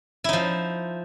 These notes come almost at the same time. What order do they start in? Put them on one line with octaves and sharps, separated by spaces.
E4 D#4 F3